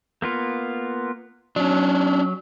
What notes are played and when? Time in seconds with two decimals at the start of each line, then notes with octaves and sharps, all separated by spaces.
0.22 A#3 B3 F4
1.56 F#3 C#4 D4